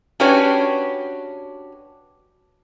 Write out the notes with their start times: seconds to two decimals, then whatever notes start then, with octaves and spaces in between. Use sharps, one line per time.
0.20 C#4 D4 F#4 G4 B4 C#5